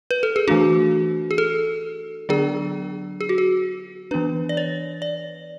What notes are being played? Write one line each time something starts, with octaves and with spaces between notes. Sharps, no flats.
B4
A4
G#4
E3 A3 D4 F#4
G#4
A4
D3 F#3 B3 D4 G#4
G#4
F#4
G#4
E3 B3 D4 B4
D5
C#5
D5